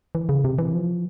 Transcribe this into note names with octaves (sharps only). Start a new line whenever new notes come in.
E3
C#3
C3
E3
F3